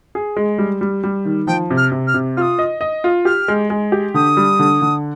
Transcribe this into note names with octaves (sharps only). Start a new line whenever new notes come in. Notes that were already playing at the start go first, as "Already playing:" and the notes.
G#4
G#3
G3
G3
G3
D#3
F3 G5
C3
F6
C3
F6
C3
F4 D#6 F6
D#5
D#5
F4
G4 F6
G#3
G#3
G4
D3 D#6
G3
D3
D3